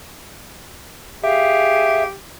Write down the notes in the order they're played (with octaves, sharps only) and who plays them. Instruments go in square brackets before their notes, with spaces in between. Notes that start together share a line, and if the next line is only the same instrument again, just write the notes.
[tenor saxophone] G4 [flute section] G#4 F5 [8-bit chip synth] E5